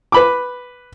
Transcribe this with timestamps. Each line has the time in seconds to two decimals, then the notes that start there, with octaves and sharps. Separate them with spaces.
0.12 B4 B5 D6